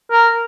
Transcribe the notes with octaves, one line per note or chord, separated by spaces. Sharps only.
A#4